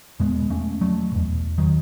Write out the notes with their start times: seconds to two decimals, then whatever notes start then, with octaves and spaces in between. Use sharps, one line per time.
0.20 E2 B2 G#3 B3
0.50 A3 C#4
0.81 F#3 A3
1.12 E2 B2
1.58 D#3 F#3